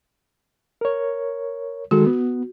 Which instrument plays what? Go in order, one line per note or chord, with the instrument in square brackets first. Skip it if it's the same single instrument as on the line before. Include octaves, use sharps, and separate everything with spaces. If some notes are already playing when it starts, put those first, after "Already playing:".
[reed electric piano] A#4 C#5
[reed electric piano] D#3 G#3 A4 [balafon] F#4
[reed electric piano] B3